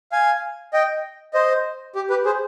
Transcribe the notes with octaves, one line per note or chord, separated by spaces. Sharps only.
F5 G#5
D#5 G5
C5 D#5
G4
G4 B4
G#4 C5